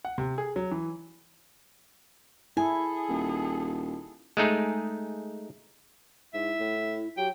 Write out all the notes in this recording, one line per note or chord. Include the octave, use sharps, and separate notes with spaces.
F#5
C3
G#4
F#3
E3
E4 G#4 A4 G#5
D#1
G#3 A3 D#4 G#4
G#2 E4 E5
A2
F#3 G4 G5